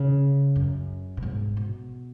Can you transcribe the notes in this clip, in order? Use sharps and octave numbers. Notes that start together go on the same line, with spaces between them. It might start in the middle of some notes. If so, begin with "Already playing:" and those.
Already playing: C#3
F#2
B2
G#2
B2